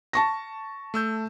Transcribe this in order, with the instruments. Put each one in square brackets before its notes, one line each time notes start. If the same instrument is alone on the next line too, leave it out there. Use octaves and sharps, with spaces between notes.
[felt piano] A5 C#6 A#6
[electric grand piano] A3 E6 G6